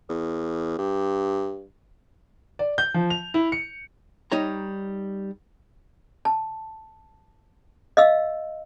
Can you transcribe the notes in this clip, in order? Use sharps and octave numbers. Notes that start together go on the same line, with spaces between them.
E2
G2
D5
G6
F3
F7
E4
C#7
G3 D#4 C#5 A#5
A5
D#5 F5 E6